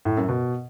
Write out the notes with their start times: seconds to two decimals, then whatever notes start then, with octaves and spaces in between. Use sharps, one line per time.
0.05 A2
0.17 F#2
0.29 B2